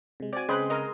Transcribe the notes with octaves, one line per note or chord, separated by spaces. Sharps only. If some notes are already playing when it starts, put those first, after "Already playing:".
C3 G#3
C4 F#4 D5 G#5
C#3 G#3 C4 B4 G5 B5
A#4 D#5